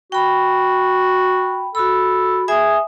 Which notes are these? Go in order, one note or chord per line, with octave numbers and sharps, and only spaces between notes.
F#4 G5 B5
F#4 A4 B5
G#4 E5 G#5 D#6